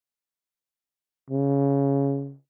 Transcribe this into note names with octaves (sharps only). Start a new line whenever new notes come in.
C#3